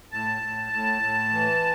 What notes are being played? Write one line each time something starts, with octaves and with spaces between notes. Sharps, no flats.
A2 A5
A2
A2
A2
E3